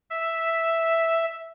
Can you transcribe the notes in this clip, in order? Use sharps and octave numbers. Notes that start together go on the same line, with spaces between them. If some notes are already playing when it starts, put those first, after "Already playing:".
E5